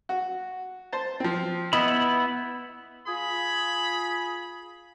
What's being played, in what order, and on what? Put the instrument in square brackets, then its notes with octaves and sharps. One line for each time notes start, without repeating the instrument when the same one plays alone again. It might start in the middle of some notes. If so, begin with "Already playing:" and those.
[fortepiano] F#4
C5 A5
F3 C4
[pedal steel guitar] B3 E4 B5 [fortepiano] D#5
[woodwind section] F4 G#4 [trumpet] B5